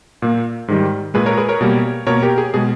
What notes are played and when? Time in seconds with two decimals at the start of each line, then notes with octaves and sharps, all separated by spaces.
0.22 A#2 A#3
0.68 G#2 D#3 G3
1.14 A#2 G#3 G#4 B4
1.26 A#4 C#5
1.38 G#4 B4
1.49 A#4 C#5
1.61 B2 G3 A#3
2.07 B2 A#3 A#4 C#5
2.23 G4 A#4
2.38 G#4
2.54 B2 G#3 G#4